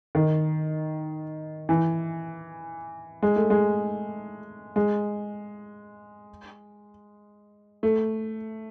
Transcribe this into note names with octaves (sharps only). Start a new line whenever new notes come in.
D#3
E3
G#3
A3
G#3
G#3
A3